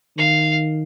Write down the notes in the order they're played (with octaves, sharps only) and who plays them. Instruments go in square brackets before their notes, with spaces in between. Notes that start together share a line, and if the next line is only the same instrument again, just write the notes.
[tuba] D#3 [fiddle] F5